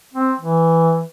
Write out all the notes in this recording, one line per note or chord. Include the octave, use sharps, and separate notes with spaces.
C4
E3